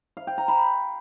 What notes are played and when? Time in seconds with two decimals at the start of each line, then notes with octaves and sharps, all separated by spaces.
0.17 F5
0.27 G5
0.38 A#5
0.48 B5